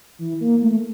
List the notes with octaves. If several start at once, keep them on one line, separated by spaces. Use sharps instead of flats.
E3
A#3
A3